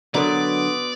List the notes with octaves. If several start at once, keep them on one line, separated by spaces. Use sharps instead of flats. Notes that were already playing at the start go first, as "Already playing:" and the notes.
D3 F#3 B3 F#4 A#4 D5 C6 D#6